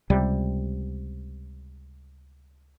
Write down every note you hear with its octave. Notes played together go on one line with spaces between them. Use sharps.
C#2 C3 G3